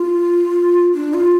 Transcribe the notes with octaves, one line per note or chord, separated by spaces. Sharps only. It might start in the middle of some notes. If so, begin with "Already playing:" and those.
Already playing: F4
D4
F4